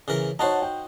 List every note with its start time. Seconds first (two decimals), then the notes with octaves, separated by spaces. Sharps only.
0.08 C#3 E3 A#4
0.39 D#4 F#4 C5 C#5 F#5 A5
0.62 G5